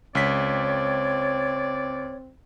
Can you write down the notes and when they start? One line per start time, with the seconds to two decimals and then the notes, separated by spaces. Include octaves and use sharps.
0.15 C#2 C4 C#5 D5 B6